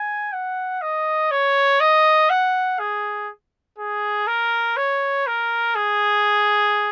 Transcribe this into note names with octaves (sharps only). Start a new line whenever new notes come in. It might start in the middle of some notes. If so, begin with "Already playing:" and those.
Already playing: G#5
F#5
D#5
C#5
D#5
F#5
G#4
G#4
A#4
C#5
A#4
G#4